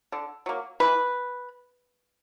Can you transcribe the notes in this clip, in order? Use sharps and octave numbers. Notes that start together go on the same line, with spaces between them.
D3
F#3 A#3
E3 B4